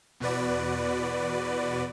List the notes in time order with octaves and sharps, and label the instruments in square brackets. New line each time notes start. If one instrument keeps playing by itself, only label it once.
[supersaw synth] E2 B2 F#4 B4 D5